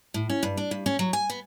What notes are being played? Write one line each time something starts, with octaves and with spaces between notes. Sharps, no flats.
A2
C#4
G2
D4
G2
C#4
F#3
G#5
B3